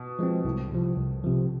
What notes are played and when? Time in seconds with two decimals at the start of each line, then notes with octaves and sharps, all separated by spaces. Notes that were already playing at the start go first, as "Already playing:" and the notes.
Already playing: B2
0.19 F3 G#3 C4
0.45 C2 A2
0.71 C3 F3
0.97 C2
1.24 C3 F3